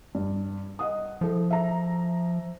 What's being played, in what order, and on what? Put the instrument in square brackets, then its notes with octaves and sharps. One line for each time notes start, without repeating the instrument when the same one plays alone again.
[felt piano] G2
D#5 F#5 D#6
[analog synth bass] F3 [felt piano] E4 A4
[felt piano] E5 A#5